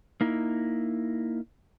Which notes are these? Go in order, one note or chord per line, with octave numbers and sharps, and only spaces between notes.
A#3 D#4 E4